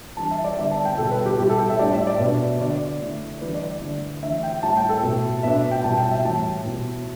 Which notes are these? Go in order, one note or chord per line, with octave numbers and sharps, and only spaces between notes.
E3 G3 D4 A5
E5
D5
D3 G3 B3 E5
A5
G5
B2 G3 B3 A4
B4
G4
B2 G3 E4 G4
A4
G5
E5
A2 G3 D4 D5
E5
D5
B2 B3 D4
D3 B3 D4 D5
D3 A3 E4
E3 G3 D4 B4
D5
D3 A3 E4
E3 A3 D4 E5
G5
A2 G3 E4 A5
G5
A4
B2 A3 E4
B2 B3 D4 E5
G5
B2 G3 E4 A5
G5
E5
A2 E3 G3 A5
B2 B3 E4